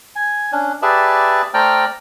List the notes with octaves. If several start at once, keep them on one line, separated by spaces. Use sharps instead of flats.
G#5
C#4 D4
G4 G#4 B4 D5 E5 A5
A3 C5 D5 G5 A#5 F6